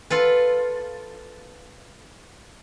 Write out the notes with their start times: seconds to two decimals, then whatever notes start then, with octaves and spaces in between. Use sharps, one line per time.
0.10 F4 A4 B4